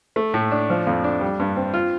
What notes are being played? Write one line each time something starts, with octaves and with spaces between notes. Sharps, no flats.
A3
A2
D4
F3
F2
D4
G3
G2
C4
F4